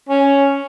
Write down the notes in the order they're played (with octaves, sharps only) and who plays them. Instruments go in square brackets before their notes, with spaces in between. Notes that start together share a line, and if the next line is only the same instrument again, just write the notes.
[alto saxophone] C#4